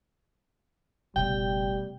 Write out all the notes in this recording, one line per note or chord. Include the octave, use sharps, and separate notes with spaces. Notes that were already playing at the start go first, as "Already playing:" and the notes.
F#1 B2 G3 A3 G5